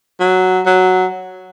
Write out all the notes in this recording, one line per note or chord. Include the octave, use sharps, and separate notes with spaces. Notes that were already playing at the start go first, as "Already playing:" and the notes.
F#3
F#3